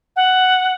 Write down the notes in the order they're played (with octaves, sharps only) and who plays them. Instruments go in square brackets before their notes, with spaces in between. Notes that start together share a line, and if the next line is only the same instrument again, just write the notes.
[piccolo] F#5